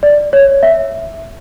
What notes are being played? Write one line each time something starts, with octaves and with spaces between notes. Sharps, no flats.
D5
C#5
E5